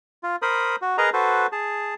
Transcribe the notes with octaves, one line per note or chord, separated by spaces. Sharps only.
F4
A#4 C5 B5 D#6
F#4
G#4 A#4 B4 D#5 A#5
F#4 A4 B4 C5
G#4 A5